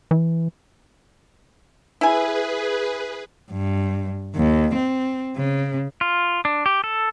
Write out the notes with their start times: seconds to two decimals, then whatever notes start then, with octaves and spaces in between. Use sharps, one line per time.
0.11 E3
2.01 E4 G#4 B4 G#5
3.51 G2
4.36 D#2
4.75 C4
5.36 C#3
6.01 F4
6.45 D4
6.66 G4
6.84 A4